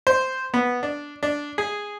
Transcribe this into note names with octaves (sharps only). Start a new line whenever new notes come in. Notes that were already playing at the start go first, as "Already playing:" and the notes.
C5
B3
D4
D4
G#4